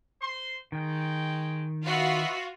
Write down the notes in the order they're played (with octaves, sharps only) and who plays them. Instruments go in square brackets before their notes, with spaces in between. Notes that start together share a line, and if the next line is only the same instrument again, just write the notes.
[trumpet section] C5 C6
[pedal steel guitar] D#3 [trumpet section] G#3 G5
[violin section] F4 F#4 [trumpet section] B4 D#5 E5